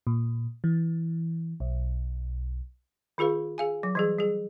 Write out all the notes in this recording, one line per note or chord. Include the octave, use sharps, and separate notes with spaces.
A#2
E3
B1
D#3 F4 G#4 B4 F5
G#4 F5 G#5
F#3
E3 G3 G#4
G3 G#4